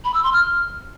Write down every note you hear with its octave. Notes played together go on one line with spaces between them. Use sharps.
B5
E6
C6
F6